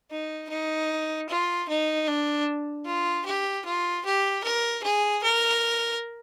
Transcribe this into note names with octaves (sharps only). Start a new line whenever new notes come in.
D#4
D#4
F4
D#4
D4
F4
G4
F4
G4
A#4
G#4
A#4